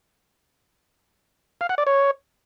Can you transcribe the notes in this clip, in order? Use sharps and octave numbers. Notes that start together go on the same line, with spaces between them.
F5
F#5
D5
C#5